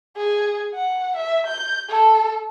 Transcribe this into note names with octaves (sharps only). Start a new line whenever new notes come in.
G#4
F#5
E5
G6
A4